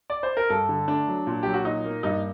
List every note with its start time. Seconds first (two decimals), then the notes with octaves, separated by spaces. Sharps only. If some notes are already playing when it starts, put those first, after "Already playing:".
0.10 D5
0.23 C5
0.37 A#4
0.50 G2 A4
0.69 D3
0.88 A3 D4
1.08 F#3
1.27 A#2
1.43 F#3 G4
1.54 F#4
1.65 A#2 D#4
1.84 A#3
2.03 G2 D#4